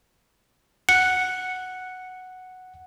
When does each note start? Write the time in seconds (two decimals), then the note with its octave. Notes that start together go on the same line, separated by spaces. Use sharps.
0.89 F#5 C#7